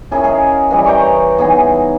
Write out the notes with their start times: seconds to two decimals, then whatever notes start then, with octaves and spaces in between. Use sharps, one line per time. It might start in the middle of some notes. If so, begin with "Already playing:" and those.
0.11 C#4 E4 G#4 A#4
0.24 G#4 D#5 F5
0.71 E3 G3 D#5
0.85 G5 A#5 C#6 D6
1.02 C#5
1.38 E3 B3 D#4 G#4